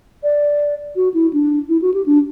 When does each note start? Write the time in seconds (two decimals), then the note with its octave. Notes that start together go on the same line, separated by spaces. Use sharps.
0.23 D5
0.96 F#4
1.14 E4
1.33 D4
1.69 E4
1.82 F#4
1.94 G4
2.06 D4